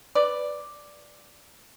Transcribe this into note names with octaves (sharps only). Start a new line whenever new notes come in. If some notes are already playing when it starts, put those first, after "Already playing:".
B4 D5